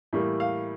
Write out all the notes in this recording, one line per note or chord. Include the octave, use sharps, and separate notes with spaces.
A2 E3 G3 A#3
F5